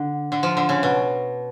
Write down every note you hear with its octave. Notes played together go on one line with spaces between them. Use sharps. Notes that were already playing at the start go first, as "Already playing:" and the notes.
Already playing: D3
D3
F3
D3
C#3
B2